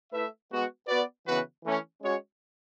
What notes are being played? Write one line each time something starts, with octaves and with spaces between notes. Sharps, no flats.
A3 E4 B4 E5
G#3 B3 F#4
B3 F#4 B4 D5
C#3 E3 B3 F#4 B4
E3 A3 C#4
G#3 C#4 F#4 C#5